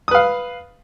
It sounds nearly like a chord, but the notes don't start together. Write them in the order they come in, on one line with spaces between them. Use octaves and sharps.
D#6 B4 F5